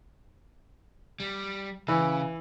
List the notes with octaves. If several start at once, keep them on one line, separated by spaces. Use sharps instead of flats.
G3
C#3 E3